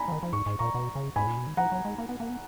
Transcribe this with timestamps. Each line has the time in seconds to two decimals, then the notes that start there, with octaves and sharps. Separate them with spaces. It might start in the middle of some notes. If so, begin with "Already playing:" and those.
Already playing: G#5 A#5 B5
0.08 F3
0.12 D#3
0.23 F3
0.33 G#2 C#6
0.46 G#2
0.59 A#2 A#5 C#6
0.75 B2
0.95 C#3
1.16 G#2 G#5 B5
1.27 A#2
1.37 B2
1.47 D#3
1.57 F3 F#5 A#5
1.72 F#3
1.85 G#3
1.98 A#3
2.09 B3
2.20 A#3
2.30 B3